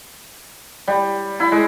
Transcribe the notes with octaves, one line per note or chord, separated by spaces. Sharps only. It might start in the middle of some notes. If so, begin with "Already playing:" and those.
G3
E4
G#3